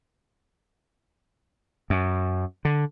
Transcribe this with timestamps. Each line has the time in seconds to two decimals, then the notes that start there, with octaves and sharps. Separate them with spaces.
1.90 F#2
2.65 D3